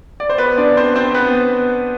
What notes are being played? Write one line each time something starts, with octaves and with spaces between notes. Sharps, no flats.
D5
C5
B3 B4
D4 D5
C4 C5
C4 C5
B3 B4